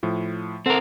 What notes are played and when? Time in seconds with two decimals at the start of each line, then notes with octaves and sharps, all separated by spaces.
0.03 A2 F3
0.66 C4 A4 A#4 F#5